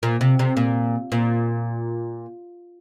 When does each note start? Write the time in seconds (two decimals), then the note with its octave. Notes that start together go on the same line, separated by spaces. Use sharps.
0.03 A#2
0.21 C3
0.39 C3
0.57 A#2
1.12 A#2